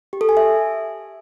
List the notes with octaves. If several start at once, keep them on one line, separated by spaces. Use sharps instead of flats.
G4
A4
G#5
E5